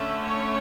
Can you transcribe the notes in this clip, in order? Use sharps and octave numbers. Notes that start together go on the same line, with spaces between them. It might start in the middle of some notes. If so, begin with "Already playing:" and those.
Already playing: D3 A3 C#4 E5
C#5